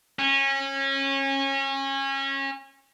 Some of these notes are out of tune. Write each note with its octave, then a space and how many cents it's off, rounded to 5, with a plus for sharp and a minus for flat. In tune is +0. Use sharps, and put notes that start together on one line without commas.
C#4 -25